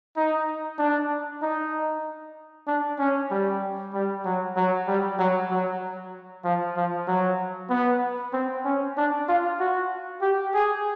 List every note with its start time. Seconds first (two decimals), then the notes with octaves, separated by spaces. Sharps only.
0.16 D#4
0.79 D4
1.42 D#4
2.67 D4
2.99 C#4
3.31 G3
3.94 G3
4.25 F#3
4.56 F#3
4.88 G3
5.19 F#3
5.51 F#3
6.44 F3
6.77 F3
7.07 F#3
7.70 B3
8.33 C4
8.65 C#4
8.97 D4
9.29 F4
9.60 F#4
10.22 G4
10.54 G#4